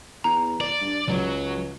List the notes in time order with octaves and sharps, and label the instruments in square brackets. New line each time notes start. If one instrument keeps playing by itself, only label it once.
[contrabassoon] E2 [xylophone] A#5
[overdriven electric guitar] D5
[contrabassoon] G2
[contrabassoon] C#2 [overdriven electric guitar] F#3